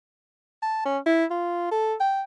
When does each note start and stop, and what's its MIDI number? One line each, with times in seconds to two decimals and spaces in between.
0.62 0.84 81
0.85 0.98 61
1.06 1.25 64
1.31 1.70 65
1.71 1.94 69
2.00 2.22 79